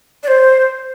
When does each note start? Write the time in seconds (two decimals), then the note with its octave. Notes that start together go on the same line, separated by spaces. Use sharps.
0.23 D5
0.28 C5